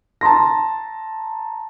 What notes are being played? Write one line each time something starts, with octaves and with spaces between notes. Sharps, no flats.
A5 A#5 C6 A#6